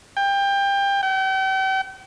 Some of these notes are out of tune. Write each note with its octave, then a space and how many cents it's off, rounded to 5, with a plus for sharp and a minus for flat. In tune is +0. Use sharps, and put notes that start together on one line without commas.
G5 +25
G5 -40